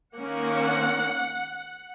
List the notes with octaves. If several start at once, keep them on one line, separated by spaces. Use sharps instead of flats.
D#3 A#3 C#4 F#5